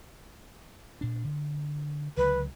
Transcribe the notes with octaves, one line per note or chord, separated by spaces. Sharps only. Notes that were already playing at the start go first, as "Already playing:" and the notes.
A#2 D4
D3
C#2 D3 F#3 B4